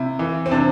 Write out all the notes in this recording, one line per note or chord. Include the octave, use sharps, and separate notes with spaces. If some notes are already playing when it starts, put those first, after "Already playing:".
Already playing: C3 E4
E3
C4
C3 D4